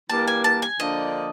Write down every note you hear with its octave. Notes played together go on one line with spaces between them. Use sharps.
E3 G3 A#3 D4 A5
G#5
A5
G#5
D3 F3 A#3 D4 D#5